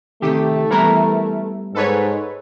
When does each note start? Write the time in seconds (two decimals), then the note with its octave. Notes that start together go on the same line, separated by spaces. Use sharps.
0.22 C3 D#3 A3 G4
0.71 E3 G3 B3 E4 A#4 A#5
1.75 G#2 A4 B4 C#5